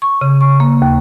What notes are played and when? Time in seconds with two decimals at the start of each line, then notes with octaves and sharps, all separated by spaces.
0.02 C#6
0.21 C#3
0.41 C#6
0.60 A#3
0.82 D#2